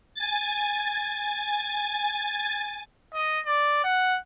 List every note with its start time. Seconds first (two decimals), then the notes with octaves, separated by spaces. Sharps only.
0.15 G#5 A6
3.14 D#5
3.46 D5
3.84 F#5